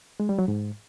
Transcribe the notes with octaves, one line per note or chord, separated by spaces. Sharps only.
G#3
G3
F#3
G#2